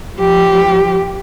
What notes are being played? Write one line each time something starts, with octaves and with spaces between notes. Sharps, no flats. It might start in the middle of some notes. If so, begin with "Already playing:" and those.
F3 G4